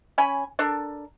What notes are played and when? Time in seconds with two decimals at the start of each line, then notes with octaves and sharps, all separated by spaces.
0.18 C#4 G#5 B5
0.59 D4 A4 A#4